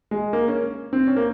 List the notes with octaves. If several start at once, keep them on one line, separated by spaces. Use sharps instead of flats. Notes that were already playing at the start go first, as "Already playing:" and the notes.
G#3
A#3
C#4
C4
C#4
A#3